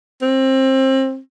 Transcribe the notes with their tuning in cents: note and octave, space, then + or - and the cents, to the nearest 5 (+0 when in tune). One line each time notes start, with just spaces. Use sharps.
C4 +25